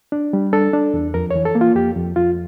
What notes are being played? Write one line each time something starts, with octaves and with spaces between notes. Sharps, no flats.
D4
G3
D4 A4
D4
E2
F2 A#4
E3 C#5
A4
A#3
F4
F2 G4
F2
F2 F4